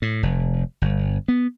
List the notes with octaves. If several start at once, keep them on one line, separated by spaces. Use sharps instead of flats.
A2
F1
G1
B3